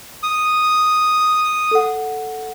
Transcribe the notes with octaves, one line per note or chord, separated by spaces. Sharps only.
D#6
A4 F#5